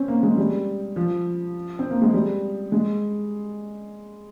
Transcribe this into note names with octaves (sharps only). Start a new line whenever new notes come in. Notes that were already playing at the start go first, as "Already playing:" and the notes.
Already playing: C4 C#4
A#3
G#3
G3
F3
C4
A#3
G#3
G3
G#3